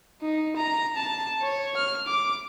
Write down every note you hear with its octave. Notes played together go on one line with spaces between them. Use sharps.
D#4
A#5
A5
C#5
F6
D6